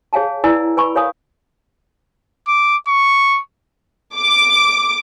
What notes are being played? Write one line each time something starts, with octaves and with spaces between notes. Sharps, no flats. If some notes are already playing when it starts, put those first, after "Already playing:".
G#4 C#5 F5 G#5 A5
E4 B4 D5 G#5 A#5 E6
B4 G#5 B5 C#6
A#4 C#5 F5 G#5 D#6
D6
C#6
D6